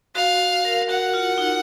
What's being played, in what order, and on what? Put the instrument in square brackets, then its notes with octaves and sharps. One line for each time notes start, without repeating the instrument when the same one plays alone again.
[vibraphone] F#4 [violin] F5
[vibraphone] A#4
[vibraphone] F#4 [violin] F#5
[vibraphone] F4
D#4